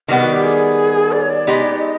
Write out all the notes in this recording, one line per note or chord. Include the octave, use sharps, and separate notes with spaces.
D#3 G3 B3 B4
F#4
G4
G#4
D5
C#5
D5
G#3 B3 D#4 G4
D#5